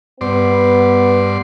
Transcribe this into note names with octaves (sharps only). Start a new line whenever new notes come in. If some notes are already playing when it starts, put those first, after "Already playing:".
G2 B3 D5 C6